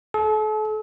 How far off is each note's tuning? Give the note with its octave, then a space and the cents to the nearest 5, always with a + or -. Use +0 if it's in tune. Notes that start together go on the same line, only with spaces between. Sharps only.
A4 -40